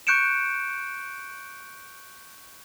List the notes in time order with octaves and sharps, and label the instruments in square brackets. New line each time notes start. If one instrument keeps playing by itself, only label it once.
[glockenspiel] C#6 F#6 G6 C#7 D7 E7